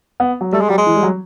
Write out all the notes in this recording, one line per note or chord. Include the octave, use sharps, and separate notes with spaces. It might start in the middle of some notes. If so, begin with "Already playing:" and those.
B3
F#3
G3 A3
G#3
F#3 G3
G#3
E3
G3
F#3